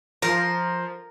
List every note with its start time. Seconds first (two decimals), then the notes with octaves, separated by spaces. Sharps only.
0.22 F3 A#4